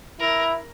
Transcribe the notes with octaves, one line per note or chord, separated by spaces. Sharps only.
E4 A#4